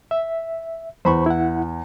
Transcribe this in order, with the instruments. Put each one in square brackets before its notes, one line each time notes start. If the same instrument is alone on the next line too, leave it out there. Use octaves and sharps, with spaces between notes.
[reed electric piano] E5
[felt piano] E2 [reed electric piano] C5 B5 C#6
[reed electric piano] E4 F#5